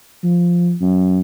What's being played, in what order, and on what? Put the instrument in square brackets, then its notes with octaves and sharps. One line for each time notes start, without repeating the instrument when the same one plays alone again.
[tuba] F3
F#2